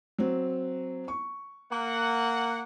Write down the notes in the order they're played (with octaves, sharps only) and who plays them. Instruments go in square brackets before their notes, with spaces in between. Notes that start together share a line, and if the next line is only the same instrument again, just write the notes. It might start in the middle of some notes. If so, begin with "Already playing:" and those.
[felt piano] F#3 C4
C#6
[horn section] A#3 F#5